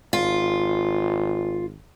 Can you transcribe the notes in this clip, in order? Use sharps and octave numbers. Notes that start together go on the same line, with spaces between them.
G#1 F4